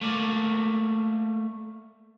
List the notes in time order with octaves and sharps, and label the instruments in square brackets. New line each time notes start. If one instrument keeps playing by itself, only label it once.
[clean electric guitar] A3 A#3 D5